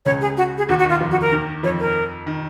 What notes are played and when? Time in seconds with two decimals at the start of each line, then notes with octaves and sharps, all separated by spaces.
0.06 C#2 C#3 C#5
0.21 G#4
0.37 F#4
0.58 G#4
0.69 D#2 D#3 F#4
0.79 F#4
0.84 D#2 D#3
0.90 F4
1.01 F2 F3
1.11 F#4
1.21 A#4
1.32 D#2 D#3
1.63 F2 F3 C#5
1.80 A#4
2.27 D#3